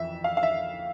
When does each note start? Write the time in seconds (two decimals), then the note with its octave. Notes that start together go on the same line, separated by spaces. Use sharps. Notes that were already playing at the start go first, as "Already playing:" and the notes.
Already playing: F2 E3 E5
0.24 F5
0.37 F5
0.43 E5